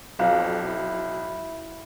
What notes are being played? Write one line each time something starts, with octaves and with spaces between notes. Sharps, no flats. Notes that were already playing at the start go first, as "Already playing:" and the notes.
B1 F2 F5
E4